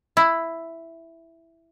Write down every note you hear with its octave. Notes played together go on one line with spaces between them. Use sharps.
E4